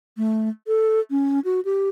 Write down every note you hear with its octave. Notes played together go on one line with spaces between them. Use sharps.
A3
A4
C#4
F#4
G4